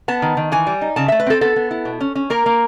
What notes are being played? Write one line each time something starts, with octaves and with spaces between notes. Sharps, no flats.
B3 A5
D#3
D#3
E3 G#5
G3
D#4
C#3 A5
A3 E5
B4
C4 A4
B3 A4
B3
E4
B2
C#4
C#4
A#3 A#4
A#3